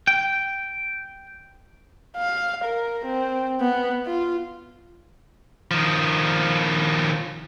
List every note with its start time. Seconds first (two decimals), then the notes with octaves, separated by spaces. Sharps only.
0.07 G5
2.16 F5
2.64 A#4
3.06 C4
3.60 B3
4.06 F4
5.71 D#3 F3